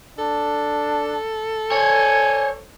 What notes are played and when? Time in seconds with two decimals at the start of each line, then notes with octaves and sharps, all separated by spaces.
0.19 D4 A4
1.72 C5 C#5 G#5